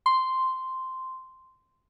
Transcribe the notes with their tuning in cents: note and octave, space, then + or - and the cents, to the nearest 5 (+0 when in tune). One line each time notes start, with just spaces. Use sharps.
C6 -5